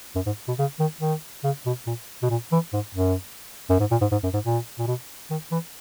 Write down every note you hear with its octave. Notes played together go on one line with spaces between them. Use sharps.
F#2
G#2
B2
C#3
D#3
D#3
C#3
B2
A#2
B2
A#2
E3
G#2
F#2
F#2
G#2
A#2
G#2
G#2
F#2
G#2
A#2
A#2
B2
D#3
E3